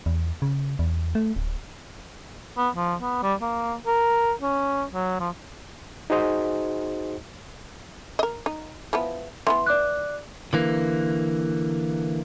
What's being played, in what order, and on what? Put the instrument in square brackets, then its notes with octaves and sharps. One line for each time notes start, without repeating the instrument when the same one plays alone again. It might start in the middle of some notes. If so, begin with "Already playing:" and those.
[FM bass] E2
C#3
E2
A3
D1
[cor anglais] B3
F3
B3
G3
A#3
A#4
C#4
F#3
F3
[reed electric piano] D#4 F#4 G#4 C5 D#5
[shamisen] A#4 D#5
D#4
E3 F3 B3
[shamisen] E3 F#3 B3 [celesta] C6
[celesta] D5 D6 F#6
[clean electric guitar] D3 E3 A#3